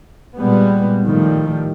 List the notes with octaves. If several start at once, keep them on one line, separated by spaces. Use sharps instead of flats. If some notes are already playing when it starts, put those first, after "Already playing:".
A#2 G3 G#3 B3
A2 D#3 F3 G3